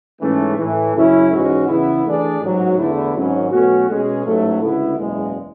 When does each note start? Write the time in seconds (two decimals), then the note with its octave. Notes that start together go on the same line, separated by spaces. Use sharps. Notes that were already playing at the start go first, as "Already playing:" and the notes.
0.21 G#2 E3 A3 C#4
0.57 A2 E3 A3
0.94 F#2 C#3 F#3 C#4 E4
1.30 G#2 E3 G#3 C#4 F#4
1.67 E2 C#3 E3 B3 E4
2.04 E3 A3 D4 G#4 D5
2.40 A1 G#2 F#3
2.77 E2 D3 A3 E4
3.14 G#1 G#2 F#3 C#4
3.50 B1 B2 A3 C#4 F#4
3.87 B2 G#3 C#4 G#4
4.25 A1 G#2 F#3 A3
4.61 D2 C#3 G#3 B3 E4
4.97 F#1 E2 B2 G#3